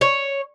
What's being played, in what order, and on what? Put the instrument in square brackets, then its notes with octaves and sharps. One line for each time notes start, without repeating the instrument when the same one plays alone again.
[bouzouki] C#5